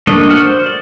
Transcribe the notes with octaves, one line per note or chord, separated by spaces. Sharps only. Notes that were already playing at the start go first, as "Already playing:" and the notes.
A3 A#3 D4 D#5
F#4 F6
C5
D5